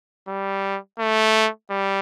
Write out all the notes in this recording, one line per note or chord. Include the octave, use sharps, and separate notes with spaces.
G3
A3
G3